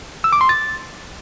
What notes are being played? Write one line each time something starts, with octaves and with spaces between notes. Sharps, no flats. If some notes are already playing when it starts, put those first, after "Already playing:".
E6
D6
C6
A6